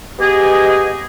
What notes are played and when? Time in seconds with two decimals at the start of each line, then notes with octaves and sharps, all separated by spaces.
0.19 B3 G4 G#4 D#5